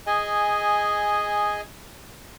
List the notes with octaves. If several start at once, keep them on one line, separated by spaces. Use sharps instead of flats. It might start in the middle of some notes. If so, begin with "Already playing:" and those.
G#4 D#5 G#5